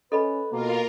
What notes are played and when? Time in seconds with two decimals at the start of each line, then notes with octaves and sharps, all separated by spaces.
0.12 C#4 A4 B4 D#5 B5
0.52 B2 A#3 F4 A#4